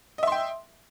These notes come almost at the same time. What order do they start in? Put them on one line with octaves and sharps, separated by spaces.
D#5 E5 C6 G5